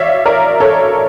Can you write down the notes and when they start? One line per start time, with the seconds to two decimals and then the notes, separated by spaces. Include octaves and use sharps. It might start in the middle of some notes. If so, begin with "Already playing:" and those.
Already playing: C#5 D5 E5 F5
0.26 A#4 D5
0.60 A4 C#5